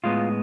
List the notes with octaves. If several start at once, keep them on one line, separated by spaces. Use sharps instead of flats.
A2 G#3 B3 F4